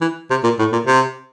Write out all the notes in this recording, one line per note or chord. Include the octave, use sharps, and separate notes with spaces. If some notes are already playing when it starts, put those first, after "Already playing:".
E3
C3
A#2
A2
A#2
C3